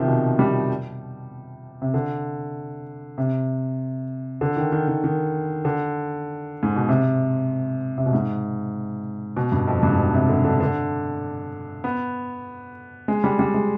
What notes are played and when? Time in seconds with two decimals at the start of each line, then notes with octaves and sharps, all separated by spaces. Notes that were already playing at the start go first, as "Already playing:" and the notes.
Already playing: C3 D#3 F3
0.08 B2
0.39 G3
1.82 C3
1.94 D3
3.18 C3
4.41 D3
4.57 D#3
4.72 D#3
4.88 D#3
5.04 D#3
5.65 D3
6.63 G#2
6.76 B2
6.88 C3
7.98 C3
8.06 B2
8.13 G#2
9.37 B2
9.52 G2
9.67 F2
9.83 G2
9.92 G#2
9.99 B2
10.14 C3
10.29 D3
10.45 D3
10.61 D3
11.84 B3
13.08 G#3
13.24 G3
13.39 G3
13.54 G#3